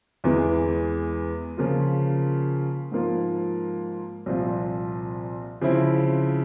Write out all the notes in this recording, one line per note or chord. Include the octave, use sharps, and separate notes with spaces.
E2 E3 G#3
C#3 F3 A#3 F4
G#2 F3 A#3 F4
C2 A#2 F3 C4 F4
C#3 F3 C4 E4